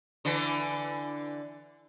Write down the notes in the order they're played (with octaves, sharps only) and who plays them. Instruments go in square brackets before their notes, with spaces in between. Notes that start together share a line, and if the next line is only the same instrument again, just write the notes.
[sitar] D3 E3